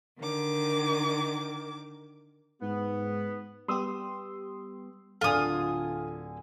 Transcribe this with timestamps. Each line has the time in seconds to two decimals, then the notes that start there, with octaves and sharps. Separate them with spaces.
0.18 D3 D#3 D6
2.62 G#2 B3
3.68 G3 B3 G4 C6 D#6 E6
5.21 D1 D3 F4 A4 G#5 D#6